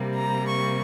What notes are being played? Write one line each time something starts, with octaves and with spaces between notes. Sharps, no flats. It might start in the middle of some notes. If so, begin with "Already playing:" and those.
Already playing: C3 G3 A#3
A#5
C#6